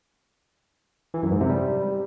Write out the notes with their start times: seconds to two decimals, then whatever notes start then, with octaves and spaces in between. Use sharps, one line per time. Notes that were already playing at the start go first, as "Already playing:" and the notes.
1.14 E3
1.23 F#2
1.32 G#2
1.41 C3
1.49 G3